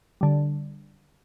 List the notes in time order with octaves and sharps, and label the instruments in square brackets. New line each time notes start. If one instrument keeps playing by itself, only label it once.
[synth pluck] D3 G3